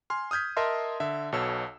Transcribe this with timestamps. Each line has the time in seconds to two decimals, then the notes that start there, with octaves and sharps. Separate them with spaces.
0.10 G#5 C6 F6
0.31 D#6 F6 G6 G#6 B6
0.57 A#4 D#5 E5 A5 C6
1.00 D3 E5
1.32 B1 B2 A4 C#5 A5 E6